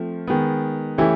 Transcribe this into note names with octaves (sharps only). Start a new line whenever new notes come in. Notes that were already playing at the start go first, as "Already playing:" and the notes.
Already playing: F3 A3 C4
D#3 G#3 B3
E3 A3 C#4 E4 G4